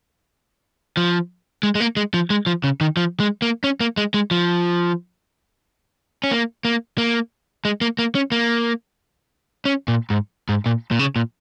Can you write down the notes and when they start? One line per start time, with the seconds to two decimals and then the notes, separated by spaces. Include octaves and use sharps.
0.97 F3
1.63 G#3
1.75 G#3
1.80 A#3
1.97 G#3
2.14 F3
2.30 G#3
2.46 F3
2.64 C#3
2.81 D#3
2.97 F3
3.20 G#3
3.42 A#3
3.64 C#4
3.80 A#3
3.97 G#3
4.14 G#3
4.31 F3
6.24 C#4
6.31 A#3
6.65 A#3
6.98 A#3
7.65 G#3
7.81 A#3
7.99 A#3
8.15 C#4
8.32 A#3
9.65 C#4
9.88 A#2
10.10 G#2
10.49 G#2
10.66 A#2
10.91 A#2
10.99 C#3
11.16 A#2